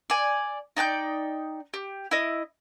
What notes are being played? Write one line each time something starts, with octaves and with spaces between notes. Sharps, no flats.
D5 G#5
D#4 D5 G5 G6
G4
E4 D#5